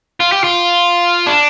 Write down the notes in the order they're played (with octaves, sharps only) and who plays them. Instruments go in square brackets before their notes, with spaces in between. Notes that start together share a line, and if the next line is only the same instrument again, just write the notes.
[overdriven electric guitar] F4
G4
F4
D4